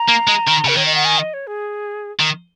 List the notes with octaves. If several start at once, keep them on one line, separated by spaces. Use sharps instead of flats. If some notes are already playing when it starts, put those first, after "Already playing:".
Already playing: A#5
A#3
G#3
D#3
C#3 A#4
D#3 C#5
D#5
F#5
G#5
D#5
C#5
G#4
D#3